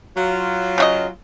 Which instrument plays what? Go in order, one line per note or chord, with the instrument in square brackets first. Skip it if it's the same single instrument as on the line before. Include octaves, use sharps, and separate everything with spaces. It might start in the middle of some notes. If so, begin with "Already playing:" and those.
[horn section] F#3 F4
[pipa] C#3 F#4 D#5